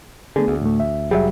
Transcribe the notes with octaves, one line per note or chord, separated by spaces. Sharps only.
D3 A3 B3 G#4
D2
A2 A3
E5
F1 F#3 G3 G#4 E5